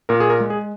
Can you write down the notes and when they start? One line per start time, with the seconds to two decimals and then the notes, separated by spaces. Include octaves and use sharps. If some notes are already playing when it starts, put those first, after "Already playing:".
0.09 A#2 A#4
0.20 G#4
0.30 A#4
0.40 G#3
0.50 G#4